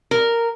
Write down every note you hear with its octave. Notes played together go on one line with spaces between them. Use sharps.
A#4